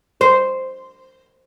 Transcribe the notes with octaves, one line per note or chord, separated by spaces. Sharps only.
C5